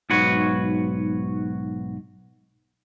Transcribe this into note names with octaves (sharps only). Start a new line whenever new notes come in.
B1 G#2 F#4 B4 C#5